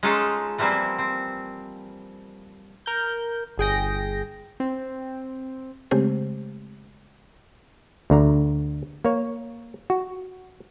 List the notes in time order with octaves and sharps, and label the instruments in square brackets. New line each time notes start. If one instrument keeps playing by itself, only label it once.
[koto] G#3 C#4 D#4 F4 A4
E3 F3 G3 A#3 C4
C4
[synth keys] A#4 G6
G1 G#4 G5 A#6
C4
[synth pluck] C#3 G#3 A3 C4 G4 C5
[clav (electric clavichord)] D2 D3 A#5
A#3 C#5
F#4